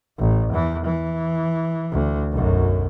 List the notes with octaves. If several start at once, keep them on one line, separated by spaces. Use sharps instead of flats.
A1
E2 E3
E3
D2
B1 F#2